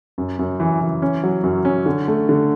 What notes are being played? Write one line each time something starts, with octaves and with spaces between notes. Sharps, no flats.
F#2
F#2
E3
E3
C#4
F#3
F#2
C#4
D3
A3
D3